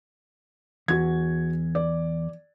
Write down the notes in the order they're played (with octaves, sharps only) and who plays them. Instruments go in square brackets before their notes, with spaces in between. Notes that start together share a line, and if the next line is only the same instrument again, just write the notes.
[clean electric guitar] E2 [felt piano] F#4 G#6
[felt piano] D5